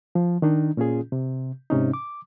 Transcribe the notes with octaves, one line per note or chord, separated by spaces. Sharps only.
F3
D#3 D4 D#4
A#2 C#4 F4 G#4
C3
G#2 C3 C#4 D#4
D6